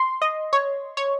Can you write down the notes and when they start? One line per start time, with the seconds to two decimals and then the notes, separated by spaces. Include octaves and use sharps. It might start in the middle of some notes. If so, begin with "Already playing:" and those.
Already playing: C6
0.22 D#5
0.53 C#5
0.97 C#5